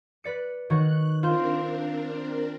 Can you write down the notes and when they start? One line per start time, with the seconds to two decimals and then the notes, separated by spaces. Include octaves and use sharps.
0.24 B4 D5 C#7
0.70 D#3 F#4 C#5 F#6
1.23 C4 D4 F4 A#4 C5